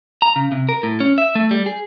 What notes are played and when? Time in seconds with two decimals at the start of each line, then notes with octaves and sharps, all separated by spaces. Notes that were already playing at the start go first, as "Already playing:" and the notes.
0.22 A#5
0.36 C#3
0.52 C3
0.69 A#4
0.83 A2
1.00 C#4
1.18 E5
1.35 A3
1.51 G3
1.66 G#4